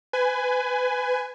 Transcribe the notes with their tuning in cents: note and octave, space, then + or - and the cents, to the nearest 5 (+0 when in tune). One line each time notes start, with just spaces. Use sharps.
B4 +25 G#5 +0